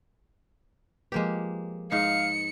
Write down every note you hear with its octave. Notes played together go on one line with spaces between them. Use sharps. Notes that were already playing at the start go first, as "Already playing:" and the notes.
F3 G#3 A#3 G4 B4
G#2 D#4 F5 C#7